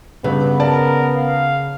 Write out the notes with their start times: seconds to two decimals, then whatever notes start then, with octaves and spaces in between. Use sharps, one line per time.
0.24 G2 C#3 B3 B4
0.60 A#4 D5 A5
1.16 F5